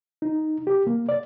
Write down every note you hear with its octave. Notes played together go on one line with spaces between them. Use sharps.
D#4
G4
A#3
D5